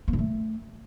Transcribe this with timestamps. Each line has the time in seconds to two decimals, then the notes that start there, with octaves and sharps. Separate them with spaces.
0.08 A#3
0.13 D3
0.19 A3